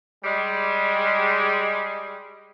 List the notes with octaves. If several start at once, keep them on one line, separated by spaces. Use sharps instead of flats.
G3 G#3